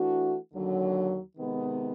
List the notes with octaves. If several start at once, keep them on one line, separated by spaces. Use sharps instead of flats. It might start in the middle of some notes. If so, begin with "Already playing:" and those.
Already playing: E3 A3 D4 F#4
D#2 D3 F#3
C3 D#3 G#3 B3